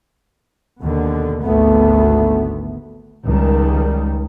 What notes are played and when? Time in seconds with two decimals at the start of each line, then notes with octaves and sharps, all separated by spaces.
0.81 D#2 B2 D3
1.41 G#1 D2 A3 B3
3.24 C#2 D#3 G3